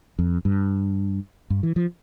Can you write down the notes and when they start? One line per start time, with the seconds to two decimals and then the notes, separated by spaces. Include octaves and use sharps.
0.19 F2
0.45 G2
1.50 G2
1.63 E3
1.76 F3